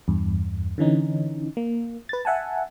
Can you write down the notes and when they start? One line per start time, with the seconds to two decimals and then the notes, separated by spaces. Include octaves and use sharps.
0.08 E2 G2
0.78 D3 E3 C#4 D#4
1.57 A#3
2.09 B4 A6
2.25 E5 F#5 G#5 A5